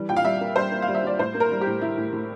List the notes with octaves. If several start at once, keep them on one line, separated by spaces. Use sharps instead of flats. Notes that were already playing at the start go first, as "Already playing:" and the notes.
Already playing: E3 G3
A#2 G5
F5
G3 E5
A#3
G3 C5
A#3
F5
G3
E5
G3 D5
A2 C5
A#3
A#4
G3
G4
A2
G3 E4
A2
A2